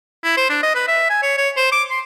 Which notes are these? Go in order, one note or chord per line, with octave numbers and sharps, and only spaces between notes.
E4
C5
D4
D#5
B4
E5
G#5
C#5
C#5
C5
D6
C6